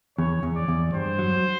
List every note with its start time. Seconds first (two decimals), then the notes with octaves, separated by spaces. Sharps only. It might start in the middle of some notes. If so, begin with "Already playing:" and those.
0.18 E2 C#5
0.43 E2
0.55 D5
0.68 E2
0.94 G2 C5
1.19 F#3